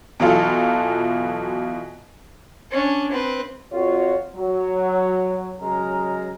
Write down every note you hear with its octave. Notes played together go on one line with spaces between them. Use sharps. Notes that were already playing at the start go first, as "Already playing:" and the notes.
B2 E3 F#3 F4 A4
C#4 D4
C4 B4
F2 F4 F#4 C#5
F#3
C#3 F#3 G#3 A#4 D#5 A#5